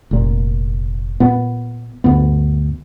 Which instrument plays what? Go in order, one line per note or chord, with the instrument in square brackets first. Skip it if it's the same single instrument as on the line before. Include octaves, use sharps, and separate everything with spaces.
[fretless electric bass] F1 A#2
A#2 B3
D2 G2 B3